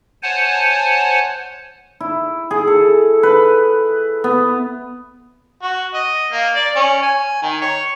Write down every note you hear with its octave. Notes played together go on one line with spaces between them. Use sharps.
C5 C#5 F#5 G#5 A5
E4
G#4
A4
B4
B3
F#4
D#5
A#3
D5
C#4
G#5
D#3
C#5